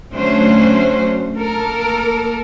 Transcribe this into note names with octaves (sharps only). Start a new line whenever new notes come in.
D3 F#3 A3 C#4 F#4 C5
A#3 A4 A#4